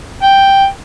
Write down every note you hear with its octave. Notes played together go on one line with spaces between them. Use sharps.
G5